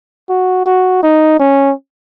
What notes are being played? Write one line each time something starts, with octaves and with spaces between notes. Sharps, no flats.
F#4
F#4
D#4
C#4